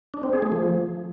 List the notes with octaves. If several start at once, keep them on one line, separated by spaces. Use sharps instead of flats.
D4
C4
G#4
A3
F3